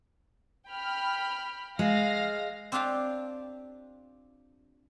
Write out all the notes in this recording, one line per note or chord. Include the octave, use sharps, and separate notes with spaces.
G5 B5 F6
G#3 F5 F6 A#6
C4 D4 F4 G4 F5 G5